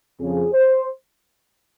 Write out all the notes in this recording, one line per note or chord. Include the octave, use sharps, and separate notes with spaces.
F2 C#3 F3 G#4
C5